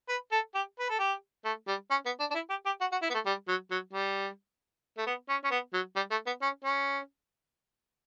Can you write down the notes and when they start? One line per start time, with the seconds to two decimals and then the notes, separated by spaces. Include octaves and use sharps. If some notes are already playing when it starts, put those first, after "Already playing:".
0.09 B4
0.32 A4
0.55 G4
0.80 B4
0.90 A4
0.99 G4
1.45 A3
1.67 G3
1.91 C#4
2.06 B3
2.20 D4
2.31 D4
2.35 E4
2.50 G4
2.66 G4
2.81 F#4
2.92 F#4
3.02 E4
3.10 B3
3.14 A3
3.26 G3
3.48 F#3
3.71 F#3
3.93 G3
4.98 A3
5.06 B3
5.29 C#4
5.44 C#4
5.51 B3
5.74 F#3
5.96 G3
6.11 A3
6.26 B3
6.42 C#4
6.64 C#4